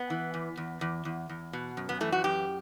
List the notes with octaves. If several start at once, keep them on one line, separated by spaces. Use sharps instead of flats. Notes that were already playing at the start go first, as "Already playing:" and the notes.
Already playing: B3
E3
E2
E2
E2
E2
E2
B2
F#2
B3
E3 A3
F#4
F#2 G4